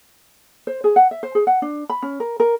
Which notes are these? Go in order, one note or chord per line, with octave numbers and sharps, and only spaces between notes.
C5
G#4
F#5
E5
C5
G#4
F#5
D4
B5
C#4
A#4
A#4